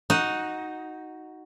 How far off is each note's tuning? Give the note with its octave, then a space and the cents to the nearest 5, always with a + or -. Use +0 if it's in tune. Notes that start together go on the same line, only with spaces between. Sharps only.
D#4 +5 F#4 +0